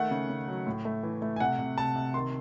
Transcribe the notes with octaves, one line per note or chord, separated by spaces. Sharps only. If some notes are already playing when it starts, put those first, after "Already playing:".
Already playing: D#3 A3 F#5
C#3
C#3
F#3
A2
A3
E3
A3
G#5
C3 F#5
C3
C3 A5
C3
D#3 C6